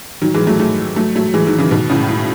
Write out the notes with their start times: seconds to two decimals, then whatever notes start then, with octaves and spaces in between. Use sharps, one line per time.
0.22 D#3 F#3
0.34 E3 G#3
0.47 F#3 A3
0.59 F#3 A3
0.96 F#3 A3
1.15 F#3 A3
1.34 E3 G#3
1.46 D#3 F#3
1.58 C#3 E3
1.71 B2 D#3
1.90 A2 C#3
2.08 A2